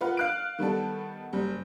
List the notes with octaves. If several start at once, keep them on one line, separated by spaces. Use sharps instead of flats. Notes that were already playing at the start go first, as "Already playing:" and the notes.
F4 A#4 B4 F#5
F5 F#6 D7
D#3 G3 B3 A4
F#1 G3